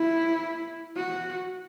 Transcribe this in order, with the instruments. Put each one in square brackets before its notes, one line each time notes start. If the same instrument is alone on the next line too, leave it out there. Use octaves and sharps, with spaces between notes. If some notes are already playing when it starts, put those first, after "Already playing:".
Already playing: [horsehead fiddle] E4
F#4